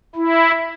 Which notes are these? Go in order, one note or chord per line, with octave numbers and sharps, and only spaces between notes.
E4